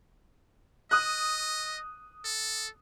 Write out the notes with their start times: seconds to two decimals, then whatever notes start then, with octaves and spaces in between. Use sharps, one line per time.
0.91 D#5 D#6 F#6
2.25 A4